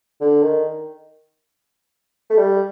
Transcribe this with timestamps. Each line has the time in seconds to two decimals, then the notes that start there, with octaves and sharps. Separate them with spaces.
0.21 D3
0.42 D#3
2.30 A3
2.37 G3